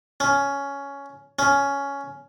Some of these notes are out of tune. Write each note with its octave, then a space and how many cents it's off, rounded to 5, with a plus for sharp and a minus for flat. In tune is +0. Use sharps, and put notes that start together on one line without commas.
C#4 +10
C#4 +10